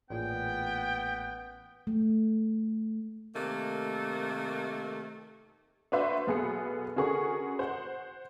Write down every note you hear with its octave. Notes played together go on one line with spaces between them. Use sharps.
A1 A#2 B3 G#4 G5
A3
C3 D#3 A3 A#3
D4 F#4 B4 C5 E5 C6
B1 B3 G#4 A4 C#7
D3 C#4 F#4 G#4 A#4 C#6
C5 F#5